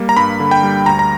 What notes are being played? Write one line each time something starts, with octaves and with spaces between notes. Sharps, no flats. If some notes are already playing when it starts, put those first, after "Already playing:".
Already playing: G3 A#3
A#5
G2 B5
D3
G5
G3
D2 A#5
A#5